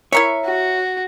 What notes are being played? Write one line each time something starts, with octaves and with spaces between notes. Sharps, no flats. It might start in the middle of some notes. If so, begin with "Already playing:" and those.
E4 A#4 C#5 E5
F#4